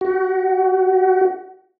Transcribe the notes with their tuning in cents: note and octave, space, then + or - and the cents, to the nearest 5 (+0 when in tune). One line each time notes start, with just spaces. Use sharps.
F#4 +25